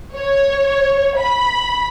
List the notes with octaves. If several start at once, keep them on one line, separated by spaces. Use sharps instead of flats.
C#5
B5